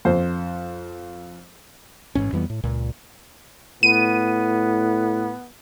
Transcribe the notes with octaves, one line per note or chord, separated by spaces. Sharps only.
F2 C5
A1 G#2 C#4
F2 E3 G3 B3
A2
C#2 A#2
A2 B3 D#7